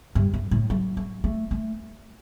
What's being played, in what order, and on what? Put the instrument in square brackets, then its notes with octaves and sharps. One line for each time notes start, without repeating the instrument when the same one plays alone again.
[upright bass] G2
F#2
A2
F#3
F#3
A3
A3